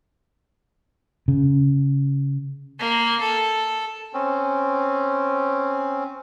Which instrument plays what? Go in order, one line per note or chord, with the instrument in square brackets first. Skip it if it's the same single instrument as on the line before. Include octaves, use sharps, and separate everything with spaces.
[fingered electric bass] C#3
[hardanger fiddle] A#3
A4
[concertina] C4 C#4